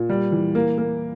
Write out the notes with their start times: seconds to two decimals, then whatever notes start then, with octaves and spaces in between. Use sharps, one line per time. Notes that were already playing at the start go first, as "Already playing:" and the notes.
Already playing: A#2
0.09 G3
0.32 E3
0.55 A#3
0.78 A#3